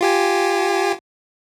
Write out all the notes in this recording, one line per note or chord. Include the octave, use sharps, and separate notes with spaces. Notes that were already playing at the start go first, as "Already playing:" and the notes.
F4 G4 G#5